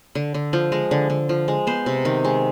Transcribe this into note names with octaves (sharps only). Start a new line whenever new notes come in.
D3
D3
F3
G#3
D3
D3
F3
G#3
B3 C5
C3
D#3
G#3